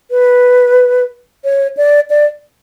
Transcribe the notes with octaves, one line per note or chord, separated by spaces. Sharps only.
B4
C#5
D5
D5